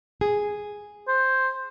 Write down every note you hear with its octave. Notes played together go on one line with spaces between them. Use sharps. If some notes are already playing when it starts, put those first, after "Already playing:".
G#4
C5